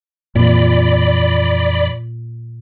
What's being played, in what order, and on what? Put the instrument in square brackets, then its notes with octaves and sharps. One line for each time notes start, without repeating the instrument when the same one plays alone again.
[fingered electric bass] F2 E3 [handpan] A#2 [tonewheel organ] D5 B5